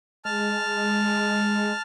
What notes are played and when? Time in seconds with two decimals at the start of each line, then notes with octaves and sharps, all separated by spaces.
0.25 G#3 A5 F6